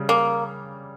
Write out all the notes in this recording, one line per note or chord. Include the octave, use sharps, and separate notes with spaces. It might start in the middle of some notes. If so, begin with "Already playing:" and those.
Already playing: C#3 G3
A#3